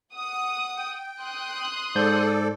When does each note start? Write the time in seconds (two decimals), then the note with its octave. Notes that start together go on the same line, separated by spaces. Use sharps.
0.14 F#5 D#6
0.77 G5
1.22 C6 D#6 F#6
1.95 G#2 A4 C5 D5 G6